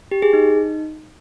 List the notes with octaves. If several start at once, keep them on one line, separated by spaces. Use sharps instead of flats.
G4
G#4
D#4